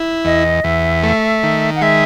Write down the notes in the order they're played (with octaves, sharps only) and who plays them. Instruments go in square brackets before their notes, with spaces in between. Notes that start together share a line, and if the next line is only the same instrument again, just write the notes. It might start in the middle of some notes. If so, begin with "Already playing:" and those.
Already playing: [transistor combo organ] E4
[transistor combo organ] E2 [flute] D#5
[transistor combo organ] E2 [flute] E5
[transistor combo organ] A3
D#3
[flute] F#5
[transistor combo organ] G#3 [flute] E5